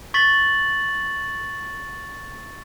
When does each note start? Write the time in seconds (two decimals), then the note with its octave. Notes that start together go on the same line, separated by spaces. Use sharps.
0.14 C#6 A6 B6 F#7